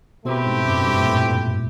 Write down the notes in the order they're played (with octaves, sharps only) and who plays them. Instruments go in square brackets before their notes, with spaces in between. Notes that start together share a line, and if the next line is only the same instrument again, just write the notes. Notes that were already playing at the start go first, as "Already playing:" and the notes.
[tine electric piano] B2 [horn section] A3 C4 E4 G4 B4
[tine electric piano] G#2
F#2
G2
A#2
A2